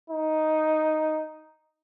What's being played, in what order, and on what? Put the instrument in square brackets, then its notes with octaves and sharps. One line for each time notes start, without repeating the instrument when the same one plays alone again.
[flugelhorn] D#4